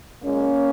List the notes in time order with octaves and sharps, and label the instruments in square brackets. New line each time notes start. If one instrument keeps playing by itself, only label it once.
[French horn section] A#2 G#3 A#3 C#4